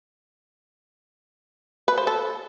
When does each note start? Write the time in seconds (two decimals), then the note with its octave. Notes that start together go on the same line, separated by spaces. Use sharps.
1.88 B4
1.98 C5
2.07 A4